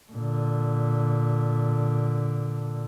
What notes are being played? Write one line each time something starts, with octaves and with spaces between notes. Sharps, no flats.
A#2 D3